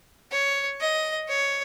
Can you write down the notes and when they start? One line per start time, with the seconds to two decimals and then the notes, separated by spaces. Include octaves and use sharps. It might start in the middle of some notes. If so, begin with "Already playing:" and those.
0.31 C#5
0.80 D#5
1.28 C#5